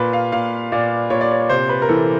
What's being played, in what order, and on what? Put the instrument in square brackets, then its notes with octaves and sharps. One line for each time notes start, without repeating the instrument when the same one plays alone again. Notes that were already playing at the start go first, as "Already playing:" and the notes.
Already playing: [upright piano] A#2 B4
F5
A#2 F5
A#2 D5
A#2 C#5
D5
C#5
C3 C5
B4
A#4
E3 A4